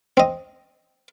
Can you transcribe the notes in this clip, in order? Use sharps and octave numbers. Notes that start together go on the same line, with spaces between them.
C4 D#5